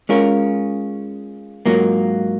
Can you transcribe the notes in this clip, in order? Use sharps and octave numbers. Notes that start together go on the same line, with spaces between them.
G#3 C#4 F4 A#4
G#2 F#3 A#3 F4 A#4